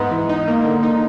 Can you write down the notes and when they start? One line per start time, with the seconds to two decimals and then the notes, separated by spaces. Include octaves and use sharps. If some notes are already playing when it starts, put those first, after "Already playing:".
Already playing: G#2 B3
0.11 E3
0.29 D#4
0.48 A#3
0.65 D3
0.83 D#4